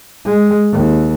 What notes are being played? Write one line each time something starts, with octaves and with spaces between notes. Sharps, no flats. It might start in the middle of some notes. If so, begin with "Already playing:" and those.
G#3
D#2